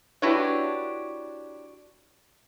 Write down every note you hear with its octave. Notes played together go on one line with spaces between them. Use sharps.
D4 E4 F#4 G4 B4 C#5